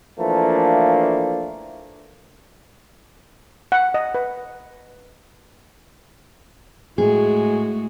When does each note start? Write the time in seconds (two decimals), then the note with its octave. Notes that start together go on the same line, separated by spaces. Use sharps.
0.18 E3 F3 A3 A#3 D4
3.72 F#5
3.94 D#5
4.15 B4
6.98 A2 G#3 F#4 G#4